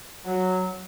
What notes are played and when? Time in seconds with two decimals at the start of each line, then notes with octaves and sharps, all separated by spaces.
0.24 F#3